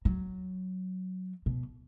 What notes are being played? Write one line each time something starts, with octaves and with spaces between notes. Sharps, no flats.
F#3
B2